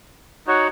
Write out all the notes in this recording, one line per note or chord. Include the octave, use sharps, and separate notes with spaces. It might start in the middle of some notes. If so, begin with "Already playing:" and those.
D#4 F#4 C#5 F#5